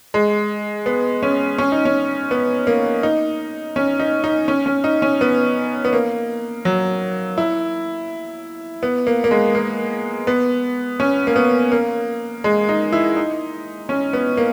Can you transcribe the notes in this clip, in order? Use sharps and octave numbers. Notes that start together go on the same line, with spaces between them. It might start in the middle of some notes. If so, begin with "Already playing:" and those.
G#3
B3
C#4
C#4
D#4
C#4
B3
A#3
D#4
C#4
D#4
D#4
C#4
C#4
D#4
C#4
B3
B3
A#3
F#3
E4
B3
A#3
A#3
G#3
A#3
B3
C#4
A#3
B3
A#3
G#3
D#4
E4
D#4
C#4
B3
A#3